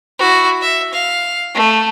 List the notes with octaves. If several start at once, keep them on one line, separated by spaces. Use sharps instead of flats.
E4 F#4
E5
F5
A3